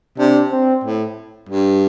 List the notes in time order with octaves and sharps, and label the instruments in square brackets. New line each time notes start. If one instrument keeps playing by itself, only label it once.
[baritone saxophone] C3 [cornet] D4
[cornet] C4
[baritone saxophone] A2
G2